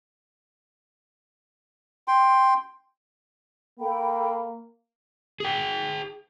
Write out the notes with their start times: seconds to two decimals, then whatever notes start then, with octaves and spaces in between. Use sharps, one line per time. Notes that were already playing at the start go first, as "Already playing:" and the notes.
2.08 G5 C6
3.80 A#3 A4 G5 B5
5.40 G#4 G5